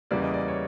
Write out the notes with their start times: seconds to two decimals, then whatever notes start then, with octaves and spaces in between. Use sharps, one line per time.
0.11 E2 C#3 E3 G3 A#3 D5
0.22 D#5
0.34 D5
0.48 C#5